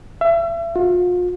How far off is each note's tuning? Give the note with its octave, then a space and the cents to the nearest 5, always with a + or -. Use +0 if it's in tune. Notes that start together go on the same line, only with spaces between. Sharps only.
E5 +35
F4 +40